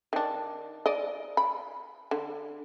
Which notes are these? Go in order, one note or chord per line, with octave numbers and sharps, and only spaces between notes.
D#3 D4
D5 D#5
B5
D3